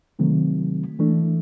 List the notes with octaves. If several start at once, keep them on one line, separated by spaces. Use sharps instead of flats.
C3 D#3 F#3 A3 C4
E3 A3 D4